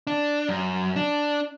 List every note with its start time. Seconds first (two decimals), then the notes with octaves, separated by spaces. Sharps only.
0.07 D4
0.49 F#2
0.96 D4